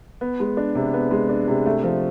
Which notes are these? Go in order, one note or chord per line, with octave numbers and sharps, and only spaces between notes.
B3
G#3
D4
C3
B3
G#3
D4
C3
A3
F3